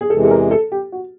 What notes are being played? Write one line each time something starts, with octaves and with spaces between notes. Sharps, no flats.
G#4
E2 C3 E3 G#3 A4
A4
A#4
A4
G4
F#4